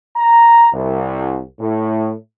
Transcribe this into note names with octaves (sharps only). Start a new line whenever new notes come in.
A#5
C2
A2